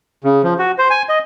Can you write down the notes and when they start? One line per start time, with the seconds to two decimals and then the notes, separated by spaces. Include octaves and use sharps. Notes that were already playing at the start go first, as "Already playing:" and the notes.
0.24 C#3
0.44 F3
0.59 F#4
0.78 C5
0.90 G#5
1.09 D#5